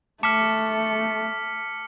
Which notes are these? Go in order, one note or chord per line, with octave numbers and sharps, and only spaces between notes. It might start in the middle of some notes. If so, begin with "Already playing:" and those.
A3 A5 D6 F6 B6 C#7 E7